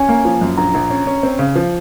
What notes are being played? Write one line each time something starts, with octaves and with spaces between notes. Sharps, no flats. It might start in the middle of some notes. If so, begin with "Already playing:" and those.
Already playing: C#4 G#5
A#3
F3
F#2
A#1 A#5
A#1
C#4
C#4
C4
C#3
F3